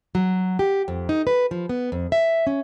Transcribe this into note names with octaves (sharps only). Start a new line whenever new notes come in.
F#3
G4
F2
D#4
B4
F3
B3
F2
E5
C#4